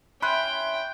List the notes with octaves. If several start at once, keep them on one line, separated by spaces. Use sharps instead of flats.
C#4 E4 G5 B5 C6 F#6